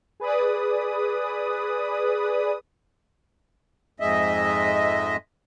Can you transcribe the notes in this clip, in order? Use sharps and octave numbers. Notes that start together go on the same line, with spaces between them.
G#4 B4 D5 D#6
F2 G#2 G#3 D#5 E5